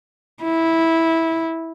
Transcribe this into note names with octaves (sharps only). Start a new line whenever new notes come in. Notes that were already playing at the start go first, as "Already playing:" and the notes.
E4